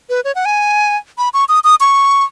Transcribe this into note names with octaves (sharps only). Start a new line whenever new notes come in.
B4
C#5
F#5
G#5
B5
C#6
D#6
D#6
C#6